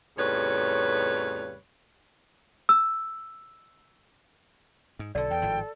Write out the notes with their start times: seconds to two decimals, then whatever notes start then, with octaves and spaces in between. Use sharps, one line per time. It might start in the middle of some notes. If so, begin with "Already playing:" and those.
0.18 F2 A2 C#3 G3 B4 C#5
2.69 E6
4.99 G#2
5.15 B1 D3 A4 D5
5.31 E2 G5
5.42 G#1 A2 F3